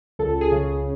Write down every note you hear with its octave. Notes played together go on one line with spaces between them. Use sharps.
C#2 A4
G#4
C#3